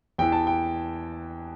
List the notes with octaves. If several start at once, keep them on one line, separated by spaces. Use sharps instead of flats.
E2 E3 G5
A5
G5